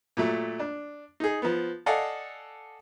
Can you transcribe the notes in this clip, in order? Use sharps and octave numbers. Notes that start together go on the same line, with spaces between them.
A#2 F#3 A3
D4
D#4 G#4
F3 B3
A4 D5 D#5 F5 F#5 G#5